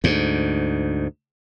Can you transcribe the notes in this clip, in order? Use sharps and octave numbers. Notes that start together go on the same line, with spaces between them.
D2 G#2